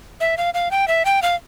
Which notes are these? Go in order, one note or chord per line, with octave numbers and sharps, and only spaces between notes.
E5
F5
F5
G5
E5
G5
F5